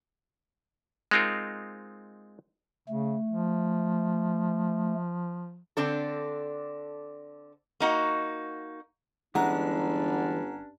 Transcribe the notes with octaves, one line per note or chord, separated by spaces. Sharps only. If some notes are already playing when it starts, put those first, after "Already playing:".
G#3 C4 D#4 F4 A#4
C#3 A3
F3
D3 C4 D4 A4
A#3 D#4 F#4
G1 G2 E3 G#3 C#4 D4 F#5 A#5